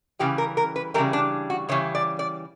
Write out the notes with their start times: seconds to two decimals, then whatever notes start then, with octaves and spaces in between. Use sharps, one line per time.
0.19 C#3 E3 G3 G4
0.38 A#4
0.57 A#4
0.76 B4
0.94 C#3 E3 G3 A#4
1.13 D4
1.50 F#4
1.69 C#3 E3 G3 C#5
1.95 D5
2.19 D5